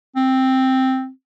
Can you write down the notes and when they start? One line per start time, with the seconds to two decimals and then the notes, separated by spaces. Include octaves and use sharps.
0.16 C4